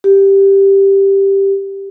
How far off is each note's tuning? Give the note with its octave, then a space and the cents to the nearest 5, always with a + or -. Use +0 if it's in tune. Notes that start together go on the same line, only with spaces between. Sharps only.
G4 +0